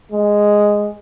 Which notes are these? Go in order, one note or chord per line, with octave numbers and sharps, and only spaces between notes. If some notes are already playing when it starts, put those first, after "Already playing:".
G#3